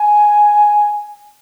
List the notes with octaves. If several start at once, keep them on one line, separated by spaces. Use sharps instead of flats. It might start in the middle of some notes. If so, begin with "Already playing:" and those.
Already playing: G#5